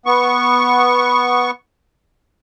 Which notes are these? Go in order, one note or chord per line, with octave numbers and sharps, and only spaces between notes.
B3 C#6